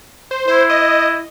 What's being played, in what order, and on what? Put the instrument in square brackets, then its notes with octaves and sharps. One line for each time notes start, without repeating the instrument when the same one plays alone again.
[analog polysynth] C5
[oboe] E4 [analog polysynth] C5
[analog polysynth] D#5